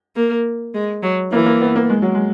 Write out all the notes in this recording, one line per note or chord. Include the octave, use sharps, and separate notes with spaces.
A#3
G#3
F#3
E3 A#3
A#3
B3
A#3
G#3
F#3
G#3